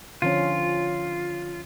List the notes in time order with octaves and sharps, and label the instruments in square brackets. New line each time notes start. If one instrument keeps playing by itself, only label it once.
[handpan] D3 F3 C#4 [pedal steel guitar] F4